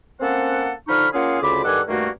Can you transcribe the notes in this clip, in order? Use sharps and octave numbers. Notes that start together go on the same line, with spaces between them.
A#3 C4 C#4 A4 F#5
D3 F3 D#4 B5 C#6 F6
A#3 C#4 F4 G#4 F5 F#5
D2 C#3 F4 B5 D6
G2 D#3 A4 F#5 G#5 D6
G2 D#3 A3 A#3 C#4 F#4